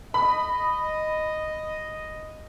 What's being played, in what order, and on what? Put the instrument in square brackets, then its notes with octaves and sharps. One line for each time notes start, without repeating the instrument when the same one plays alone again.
[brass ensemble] D#5 [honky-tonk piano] B5